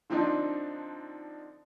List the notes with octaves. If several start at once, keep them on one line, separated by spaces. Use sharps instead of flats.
D3 F3 C4 D4 D#4